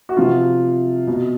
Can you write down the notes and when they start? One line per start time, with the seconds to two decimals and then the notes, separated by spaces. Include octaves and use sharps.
0.09 F#4
0.17 C3 F3 F4
1.07 B2